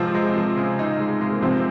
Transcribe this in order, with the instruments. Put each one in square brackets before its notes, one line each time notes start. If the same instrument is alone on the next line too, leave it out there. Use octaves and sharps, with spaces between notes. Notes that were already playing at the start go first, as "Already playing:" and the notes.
Already playing: [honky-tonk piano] C3 C4 [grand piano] F3 G#3
[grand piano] G#3
F3
C#3
D#4
G#3
G#3
[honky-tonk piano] A#3
[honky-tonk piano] C3 C4 [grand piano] F3